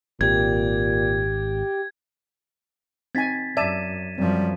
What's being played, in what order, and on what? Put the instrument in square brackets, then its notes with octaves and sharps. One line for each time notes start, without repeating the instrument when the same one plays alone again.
[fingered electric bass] G#1 [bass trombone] A#2 [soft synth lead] G4 [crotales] G#6
[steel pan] C4 D#4 G#5 [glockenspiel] G#6 A6 B6
[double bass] F#2 [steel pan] D5 E5 A5 [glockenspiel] G#6 D#7 E7
[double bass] F#2 F3 [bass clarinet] G3 [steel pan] C4